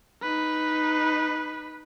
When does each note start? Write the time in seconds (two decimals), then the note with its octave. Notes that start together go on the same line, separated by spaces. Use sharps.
0.23 D#4 B4